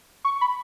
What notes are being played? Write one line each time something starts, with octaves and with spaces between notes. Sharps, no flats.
C#6
B5